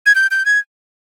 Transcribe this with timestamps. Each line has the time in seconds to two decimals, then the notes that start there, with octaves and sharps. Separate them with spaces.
0.06 G#6
0.15 G6
0.31 G6
0.46 G#6